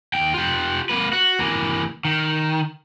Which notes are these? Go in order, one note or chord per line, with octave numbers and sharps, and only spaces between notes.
D#2 G5
F4 G4
A#3 B4
F#4
E3 A#3
D#3